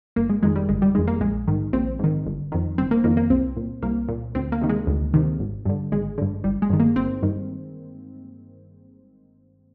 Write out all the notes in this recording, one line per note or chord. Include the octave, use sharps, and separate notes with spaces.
G1 A#3
G#3
F2 D#3 G#3
G3
G1 G#3
G3
F2 D#3 G#3
A#3
A#1 G#3
G#2 D#3
A#1 C4
G#2 D#3
G1
F2 D#3
G1 C4
A#3
F2 D#3 A#3
A#3
C2 C4
A#2
C2 A#3
A#2
D2 C4
A#3
C3 D#3
G#3
D2
C3 D#3
G#1
G2 D3
G#1 G#3
G2 D3
G1 G3
G#3
G2 D#3
A#3
G1 C4
G2 D#3